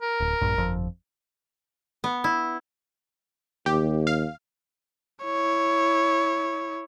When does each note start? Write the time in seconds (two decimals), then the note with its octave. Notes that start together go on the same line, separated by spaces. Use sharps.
0.02 A#4
0.20 D1
0.41 A#1 G2
0.58 G1 F2
2.04 B3
2.24 E4
3.66 D#2 G4
4.07 F5
5.24 E4 C#5